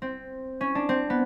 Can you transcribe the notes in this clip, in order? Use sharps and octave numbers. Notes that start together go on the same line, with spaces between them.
C4
C#4
D4
C4
B3